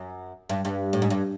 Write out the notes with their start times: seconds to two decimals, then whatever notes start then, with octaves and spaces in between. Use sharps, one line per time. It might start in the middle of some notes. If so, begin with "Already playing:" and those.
Already playing: F#2
0.49 G2
0.65 G2
0.93 A2
1.02 G#2
1.10 G2